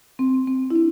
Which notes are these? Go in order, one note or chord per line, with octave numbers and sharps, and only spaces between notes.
C4
C4
E4
D4